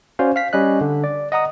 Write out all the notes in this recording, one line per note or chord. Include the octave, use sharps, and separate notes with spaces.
C#4 F#4 C5 D5 F5
F5 B6
G3 C#4 D#5 F#6
D3
D5
D#5 F#5 A#5 D#6